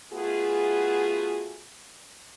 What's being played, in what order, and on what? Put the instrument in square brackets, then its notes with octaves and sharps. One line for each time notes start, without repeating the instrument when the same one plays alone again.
[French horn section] A3 B3 F4 F#4 G#4